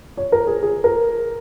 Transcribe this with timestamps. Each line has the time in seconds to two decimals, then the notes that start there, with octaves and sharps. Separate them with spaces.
0.17 C#5
0.32 A#4
0.47 G#4
0.63 G#4
0.84 A#4